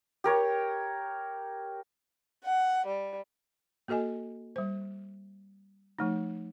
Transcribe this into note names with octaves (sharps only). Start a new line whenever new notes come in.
G4 A#4 C#5
F#5
G3
A#3 F#4 A4 D#5 G#5
G3 C5
F3 A3 D#4